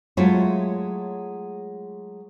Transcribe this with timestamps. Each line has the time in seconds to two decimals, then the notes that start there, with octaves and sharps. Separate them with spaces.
0.17 F#3 G#3 A3 E4 F4 C#5